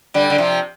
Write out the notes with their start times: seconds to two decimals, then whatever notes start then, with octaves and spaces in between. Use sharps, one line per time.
0.14 D3 G3
0.30 D3
0.38 C3 F3